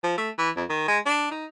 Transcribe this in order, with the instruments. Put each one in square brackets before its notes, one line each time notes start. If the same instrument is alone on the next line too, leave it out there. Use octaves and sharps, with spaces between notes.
[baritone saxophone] F3
A3
E3
F2
D#3
G#3
D4
D#4